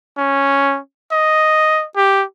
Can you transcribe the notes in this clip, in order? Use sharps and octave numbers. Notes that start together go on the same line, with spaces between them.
C#4
D#5
G4